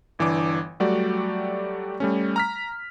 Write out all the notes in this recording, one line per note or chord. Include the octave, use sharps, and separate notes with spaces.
G1 E3 D4 D6
F#3 G3 A3 F#4 G4 D5
G3 A3 C#4
A#5 F6 B6